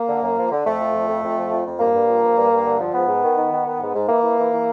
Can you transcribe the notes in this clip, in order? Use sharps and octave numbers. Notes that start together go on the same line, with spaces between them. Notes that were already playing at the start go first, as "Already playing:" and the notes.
Already playing: A#3
D3
F#2
F3
D3
F2 A3
F3
F2
F2
F2
F3
F2
F2
G2 A#3
G2
F3
G2
G2
G2
D3
F3
G#2 B3
G#2
D#3
D#3
D#3
D#3
G#2
G#2
E3 A#3
E3
E3
E3